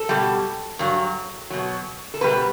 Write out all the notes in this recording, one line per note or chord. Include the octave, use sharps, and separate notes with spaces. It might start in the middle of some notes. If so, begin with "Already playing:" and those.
Already playing: A4
B2 G3
G2 F#3
B2 F#3
A4
B2 G3 B4